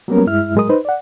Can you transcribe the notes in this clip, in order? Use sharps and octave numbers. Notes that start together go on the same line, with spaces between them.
F#3 G3 A#3 B3 C#4 A#4
G2 G#3 E4 E5 F6
A2 F#3 G#3 A#4 D#6
D#4 B4 C5
D5 F#5